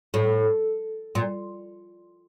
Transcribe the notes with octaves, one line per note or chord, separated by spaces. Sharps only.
A2
A#2